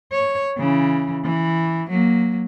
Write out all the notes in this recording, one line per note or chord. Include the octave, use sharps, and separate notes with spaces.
C#5
C#3 E3
E3
F#3 A#3